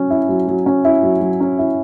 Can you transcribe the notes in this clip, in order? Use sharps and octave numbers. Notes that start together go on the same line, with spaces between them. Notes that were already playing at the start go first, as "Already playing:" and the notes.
Already playing: F#3 C#4
E4
F#3
F#3
C#4
E4
F#3
F#3
C#4
E4